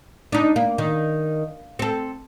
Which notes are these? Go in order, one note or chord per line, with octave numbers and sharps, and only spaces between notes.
D4 D#4
A#3
D#3
C4 A4